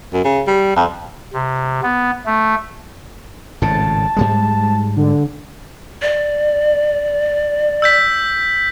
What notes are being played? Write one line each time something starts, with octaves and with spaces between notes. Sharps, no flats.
F#2
C#3
G3
F2
C3
B3
A3
G#1 A2 C#3 A5
G#2 G3 G#3
D3
D5
E6 G6 B6